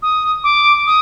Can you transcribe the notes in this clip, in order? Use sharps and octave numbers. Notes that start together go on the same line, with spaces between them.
D#6
D6
D#6